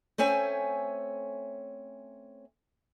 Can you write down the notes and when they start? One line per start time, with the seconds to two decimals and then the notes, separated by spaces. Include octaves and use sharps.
0.18 A3 C4 C#4 E5 G#5